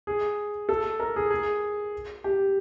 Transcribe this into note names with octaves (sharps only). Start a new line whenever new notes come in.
G#4
A4
A#4
G#4
G#4
G4